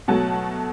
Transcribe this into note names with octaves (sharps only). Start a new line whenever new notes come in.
B2 F#3 A3 F#5 A5